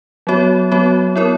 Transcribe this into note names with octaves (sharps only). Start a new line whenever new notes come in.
F#3 B3 F#4 C#5
F#3 B3 F#4 C#5
B3 E4 A#4 C#5